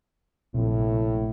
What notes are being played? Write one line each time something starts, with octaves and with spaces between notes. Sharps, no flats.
A#1 A2 C3